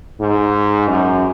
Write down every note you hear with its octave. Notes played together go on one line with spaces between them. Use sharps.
G#2
F#2